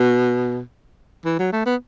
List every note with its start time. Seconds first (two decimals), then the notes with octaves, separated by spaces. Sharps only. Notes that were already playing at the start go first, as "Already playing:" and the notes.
Already playing: B2
1.25 E3
1.39 F#3
1.53 A3
1.66 B3